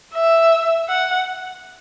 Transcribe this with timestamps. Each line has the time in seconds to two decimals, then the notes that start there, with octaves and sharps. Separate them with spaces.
0.15 E5
0.89 F#5